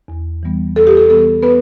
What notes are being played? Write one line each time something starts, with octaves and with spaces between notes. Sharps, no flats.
E2
E3 G3 B3
E2 A4
G4
A4
E3 G3 B3 A4
B3 B4